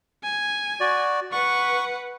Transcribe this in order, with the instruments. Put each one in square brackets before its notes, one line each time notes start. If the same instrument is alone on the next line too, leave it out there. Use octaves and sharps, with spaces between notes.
[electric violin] G#5
[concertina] F#4 D5
[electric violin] B4 F#5 [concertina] C#6